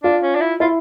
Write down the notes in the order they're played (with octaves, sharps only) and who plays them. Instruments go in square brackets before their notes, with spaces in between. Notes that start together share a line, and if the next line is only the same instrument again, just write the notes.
[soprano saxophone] D4 [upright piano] F4
[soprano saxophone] C#4
D4
E4
[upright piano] E4 [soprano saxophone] F4